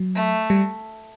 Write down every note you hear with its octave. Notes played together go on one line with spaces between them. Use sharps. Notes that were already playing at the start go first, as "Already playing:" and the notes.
Already playing: F#3
A3
G3